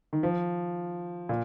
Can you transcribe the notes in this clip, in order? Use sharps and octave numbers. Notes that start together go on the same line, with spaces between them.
D#3
F3
A#2